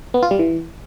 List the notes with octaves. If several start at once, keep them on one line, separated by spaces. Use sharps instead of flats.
B3
F4
G3
E3